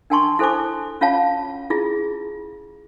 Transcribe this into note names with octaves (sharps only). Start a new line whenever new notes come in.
D4 A#4 G5 A5 C6 C#6
E4 A4 C5 G#5 A5 D6
C#4 F4 C#5 F5 A5 B5
E4 F4 G#4